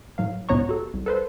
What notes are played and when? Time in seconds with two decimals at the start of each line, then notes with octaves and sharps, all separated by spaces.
0.18 A2 F#3 F5
0.49 C#2 A2 B3 C#5 A#5 C#6
0.69 F#4 A4
0.94 C2
1.06 A4 B4 C5